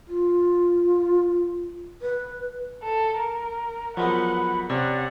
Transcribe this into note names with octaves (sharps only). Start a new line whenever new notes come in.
F4
B4
A4
A#4
F3 F#3 G#3 B3 A#4 F#5 B5
C3 C#4 D5 F#5 A6